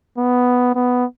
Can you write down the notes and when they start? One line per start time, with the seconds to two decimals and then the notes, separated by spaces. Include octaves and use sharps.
0.18 B3
0.75 B3